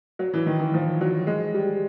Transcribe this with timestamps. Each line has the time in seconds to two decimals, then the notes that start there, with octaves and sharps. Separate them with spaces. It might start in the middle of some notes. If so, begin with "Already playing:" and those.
0.19 F#3
0.34 E3
0.46 D#3
0.59 E3
0.74 F3
1.01 F#3
1.27 G#3
1.54 G3